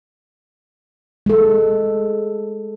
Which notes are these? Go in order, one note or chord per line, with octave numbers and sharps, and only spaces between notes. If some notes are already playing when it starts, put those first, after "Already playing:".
G#3 A4